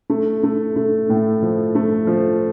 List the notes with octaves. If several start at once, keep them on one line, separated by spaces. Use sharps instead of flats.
A3
A3
A3
A2
F3
A3
F3